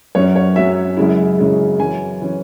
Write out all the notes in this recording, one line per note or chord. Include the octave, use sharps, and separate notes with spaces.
F#2 F#3 C#4 C#5
C#5
F#2 F#3 C#4 E5
F#2 C#3 G#3 E4
F#2 C#3 G#3 E4
F#2 E3 C#4 G#5
E3 C#4